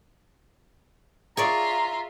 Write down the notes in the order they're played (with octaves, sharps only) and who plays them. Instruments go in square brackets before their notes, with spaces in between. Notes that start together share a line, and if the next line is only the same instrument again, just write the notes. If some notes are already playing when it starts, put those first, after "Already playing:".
[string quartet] F4 E5 [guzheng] G#4 C#5 D5 [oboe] A#5